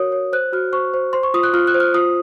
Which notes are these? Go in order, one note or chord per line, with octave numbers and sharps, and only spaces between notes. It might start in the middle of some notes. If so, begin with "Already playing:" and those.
Already playing: F#4 A#4 C#5 D#6
C#5
C5 F#6
F#4 F6
C5 C#6
C5
C5 C6
C#6
F4 D#6
F#6
F4 F6
F#6
C5
F6
F4 D#6